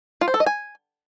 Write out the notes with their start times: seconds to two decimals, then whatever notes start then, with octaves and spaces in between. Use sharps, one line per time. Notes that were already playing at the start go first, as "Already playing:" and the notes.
0.21 F4
0.28 C5
0.34 A4
0.40 D#5
0.46 G#5